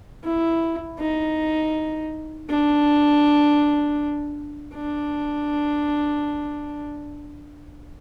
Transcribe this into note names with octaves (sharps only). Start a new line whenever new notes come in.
E4
D#4
D4
D4